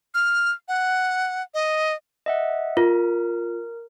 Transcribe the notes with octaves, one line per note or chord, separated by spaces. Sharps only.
F6
F#5
D#5
D#5 E5 F#5
F4 A#4